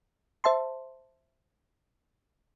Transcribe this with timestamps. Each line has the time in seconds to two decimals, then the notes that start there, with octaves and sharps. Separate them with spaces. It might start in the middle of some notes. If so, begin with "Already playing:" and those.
0.44 C5 E5 A5 C6